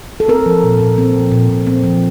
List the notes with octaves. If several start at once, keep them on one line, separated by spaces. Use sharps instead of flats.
A4
C4 A#4
F3
A#2
A#2
C4
F3
A#2
A#2
C4
F3